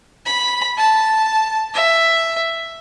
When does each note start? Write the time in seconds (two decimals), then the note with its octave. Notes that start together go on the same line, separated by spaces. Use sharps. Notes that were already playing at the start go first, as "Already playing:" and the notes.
0.26 B5
0.78 A5
1.74 E5